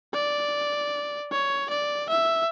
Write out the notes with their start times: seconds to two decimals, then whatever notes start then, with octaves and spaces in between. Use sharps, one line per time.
0.14 D5
1.31 C#5
1.70 D5
2.09 E5